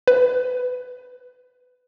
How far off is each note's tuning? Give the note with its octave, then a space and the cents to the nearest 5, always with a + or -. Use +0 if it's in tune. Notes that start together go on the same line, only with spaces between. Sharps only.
B4 +20